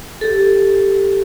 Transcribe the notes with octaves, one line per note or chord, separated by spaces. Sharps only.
G4 A4